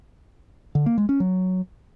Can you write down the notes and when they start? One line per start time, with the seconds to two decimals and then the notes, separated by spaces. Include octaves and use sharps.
0.75 D3
0.86 A#3
0.98 G#3
1.09 C#4
1.20 F#3